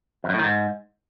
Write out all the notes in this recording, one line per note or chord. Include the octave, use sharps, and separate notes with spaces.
F2
F#2
A2
D#3
G#2